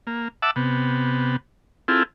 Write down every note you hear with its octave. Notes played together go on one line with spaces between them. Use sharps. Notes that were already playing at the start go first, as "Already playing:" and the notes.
A#3
E5 F#5 A5 D6 E6
C3 B3
C4 E4 F4 G#4 A4